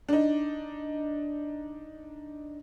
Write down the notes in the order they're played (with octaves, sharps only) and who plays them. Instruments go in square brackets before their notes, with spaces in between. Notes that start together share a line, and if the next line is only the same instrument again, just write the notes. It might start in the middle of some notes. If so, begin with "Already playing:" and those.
[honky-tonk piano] D4 D#4